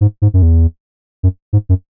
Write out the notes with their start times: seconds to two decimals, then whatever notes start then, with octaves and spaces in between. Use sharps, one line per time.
0.01 G#2
0.22 G#2
0.34 F#2
0.42 E2
1.23 F#2
1.53 G#2
1.69 F#2